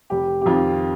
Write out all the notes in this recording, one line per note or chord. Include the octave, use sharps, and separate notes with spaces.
F1 G4
G4
F2 D#3 F4